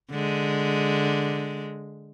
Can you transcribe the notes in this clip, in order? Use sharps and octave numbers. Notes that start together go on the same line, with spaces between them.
D3 G#3